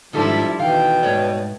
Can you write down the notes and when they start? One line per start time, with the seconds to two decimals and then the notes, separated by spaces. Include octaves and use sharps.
0.13 D2 G#2 D#3 F3 G3 D4 E4 A4
0.59 B2 D#3 E3 F5 G5
1.03 G#2 G3 A3 A4 C#5 D5